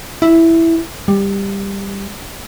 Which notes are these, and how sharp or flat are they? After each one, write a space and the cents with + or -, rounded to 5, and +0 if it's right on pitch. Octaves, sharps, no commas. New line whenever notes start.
E4 +0
G3 +15